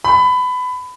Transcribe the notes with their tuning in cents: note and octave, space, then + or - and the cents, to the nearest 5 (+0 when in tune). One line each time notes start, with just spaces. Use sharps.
B5 +20